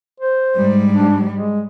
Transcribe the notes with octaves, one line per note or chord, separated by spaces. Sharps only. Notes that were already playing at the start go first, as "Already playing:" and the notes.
C5
G#2 G3
D4
G#3